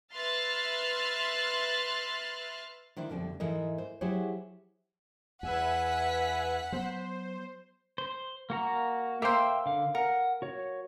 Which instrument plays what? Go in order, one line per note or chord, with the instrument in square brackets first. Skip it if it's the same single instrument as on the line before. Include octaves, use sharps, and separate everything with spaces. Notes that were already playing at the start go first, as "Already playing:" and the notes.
[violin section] B4 E5 C6 F6 F#6 A6
[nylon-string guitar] D#3 D4 E4 C5
F2 B2 D3 G3
G#2 E3 E4 A4 A#4 D#5
C5
F#3 E4 G4 G#4 C5 C#5
[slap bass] E2 [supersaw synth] B4 E5 G#5 [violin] F#5 B6
[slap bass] F#3 B3 [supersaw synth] C5
[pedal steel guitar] C5
A#3 F#4 A#5
[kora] A#3 C5 [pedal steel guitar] E5 G5 E6
[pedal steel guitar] D3 F5
[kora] A#4 [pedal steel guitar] F#5
[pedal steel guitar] F#4 C#5